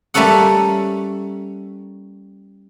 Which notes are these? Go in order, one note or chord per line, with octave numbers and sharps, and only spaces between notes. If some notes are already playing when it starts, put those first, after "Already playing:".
G3 A3 A#3 C#4 A4 F#5